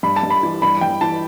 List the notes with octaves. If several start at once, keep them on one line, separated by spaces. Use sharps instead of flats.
G2 B5
A5
G2
B5
E3
G2 B5
G2 G5
E3 A5